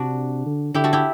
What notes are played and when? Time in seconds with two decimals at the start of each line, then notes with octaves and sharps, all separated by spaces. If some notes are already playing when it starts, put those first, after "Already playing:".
Already playing: C3 D4 F#4
0.46 D3
0.74 D3 E4 G4
0.84 F#4 A4
0.93 E4 G4